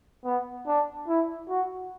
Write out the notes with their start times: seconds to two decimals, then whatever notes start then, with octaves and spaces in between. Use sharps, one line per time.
0.25 B3
0.67 D4
1.08 E4
1.49 F#4